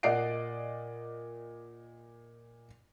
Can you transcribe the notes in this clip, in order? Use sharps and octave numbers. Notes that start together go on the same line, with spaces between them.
A#2 D5 D#5 F#5 C7 D7